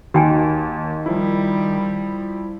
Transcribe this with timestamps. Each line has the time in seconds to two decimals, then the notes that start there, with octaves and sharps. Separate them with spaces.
0.14 D#2 D#3 F#4 G5 G#5
1.06 F3 G3 E4